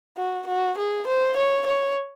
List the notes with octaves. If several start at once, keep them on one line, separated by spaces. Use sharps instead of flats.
F#4
F#4
G#4
C5
C#5
C#5